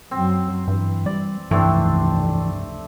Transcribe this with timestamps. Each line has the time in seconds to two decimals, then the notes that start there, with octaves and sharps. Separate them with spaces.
0.11 F#2 F#3 C4
0.68 G2 E3
1.06 G3 D5
1.51 F1 C#2 G2 E3 A3 C4 D4